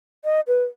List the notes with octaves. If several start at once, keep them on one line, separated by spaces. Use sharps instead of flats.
D#5
B4